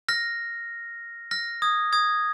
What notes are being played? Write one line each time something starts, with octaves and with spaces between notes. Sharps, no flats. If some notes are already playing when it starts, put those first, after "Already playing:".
F6 A#6
F6 A#6
D#6 G#6
D#6 G#6